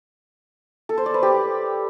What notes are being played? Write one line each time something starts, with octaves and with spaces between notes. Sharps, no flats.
A4
C5
D5
B4
G4